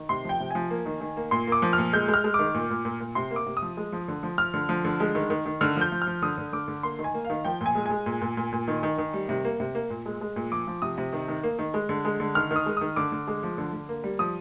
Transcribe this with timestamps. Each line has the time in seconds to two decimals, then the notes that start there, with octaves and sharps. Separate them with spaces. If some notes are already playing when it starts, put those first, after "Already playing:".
Already playing: D#3
0.09 C3 C6
0.25 F3 G5
0.40 C3
0.50 F3 G#5
0.70 A#3
0.86 D#3
1.01 D#3
1.17 A#3
1.31 A#2 C6
1.47 A#3 D6
1.62 F3
1.73 A#2 F6
1.93 G#3 G6
2.08 G#3
2.14 F6
2.24 G#3
2.34 D#3 D6
2.54 A#2
2.70 A#2
2.85 A#2
3.00 A#2
3.15 C3 C6
3.31 A#3
3.36 D6
3.46 C3
3.57 D#6
3.62 F3
3.77 G#3
3.92 F3
4.08 D3
4.23 F3
4.38 F3 F6
4.54 D3
4.69 F3
4.85 D3
5.00 G#3
5.15 D#3
5.30 D#3
5.46 D#3
5.61 D3 F6
5.76 F3 G6
5.92 F3
6.02 F6
6.07 F3
6.22 D3 D#6
6.38 D3
6.53 D3 D6
6.68 D3
6.83 A#3 C6
6.99 D#3
7.04 G#5
7.14 A#3
7.25 F5
7.30 D#3
7.45 F3 G5
7.61 A#2
7.66 G#5
7.75 G#3
7.86 G#3 G#5
8.06 A#2
8.21 A#2
8.37 A#2
8.52 A#2
8.68 D#3
8.83 D#3
8.98 D#3
9.13 G3
9.29 C3
9.45 A#3
9.60 C3
9.75 A#3
9.90 A#2
10.06 G#3
10.21 G#3
10.36 A#2
10.51 F3 D6
10.67 F3
10.82 C3 D#6
10.98 C3
11.13 D#3
11.28 D#3
11.43 A#3
11.59 D#3
11.74 G#3
11.89 D3
12.05 G#3
12.20 D3
12.35 D#3 F6
12.51 D#3 D#6
12.66 G#3
12.77 D#3 D#6
12.96 D3 D6
13.12 D3
13.28 G#3
13.43 F3
13.58 D3
13.73 D3
13.89 A#3
14.04 G3
14.19 F3 D#6